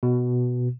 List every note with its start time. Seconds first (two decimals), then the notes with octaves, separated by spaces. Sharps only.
0.03 B2